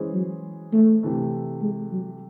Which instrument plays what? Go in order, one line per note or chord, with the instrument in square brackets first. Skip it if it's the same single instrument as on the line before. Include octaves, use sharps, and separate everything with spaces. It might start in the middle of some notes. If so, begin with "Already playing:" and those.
Already playing: [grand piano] E3 G#3 C#4 G#4 C5
[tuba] F#3
A3
[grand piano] C3 E3 A3
[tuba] G#3
F#3